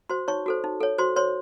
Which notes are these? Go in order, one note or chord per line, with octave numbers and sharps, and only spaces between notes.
F#4 C5 C6
D#4 C#5 C#6
F#4 A4 C5
D#4
A4 C#5
F#4 C5 C6
C5 C#5 C6